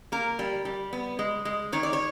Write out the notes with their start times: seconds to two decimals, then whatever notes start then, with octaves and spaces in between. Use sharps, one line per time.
0.12 A#3 A#4
0.39 G3
0.65 G3
0.93 B3
1.19 G#3
1.45 G#3
1.72 D#3 C#5
1.83 D5
1.93 C#5